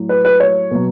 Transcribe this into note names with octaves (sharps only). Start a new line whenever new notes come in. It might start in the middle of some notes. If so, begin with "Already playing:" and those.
Already playing: A2 F#3
B4
B4
C#5
B2 F#3